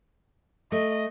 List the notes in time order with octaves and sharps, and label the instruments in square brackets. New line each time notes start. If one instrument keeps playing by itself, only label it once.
[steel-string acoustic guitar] A3 [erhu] D#5